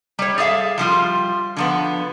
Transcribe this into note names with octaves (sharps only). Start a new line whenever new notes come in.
G3 C#5
G#4 A4 E5 F5
F3 G3 F4
D3 F3 B3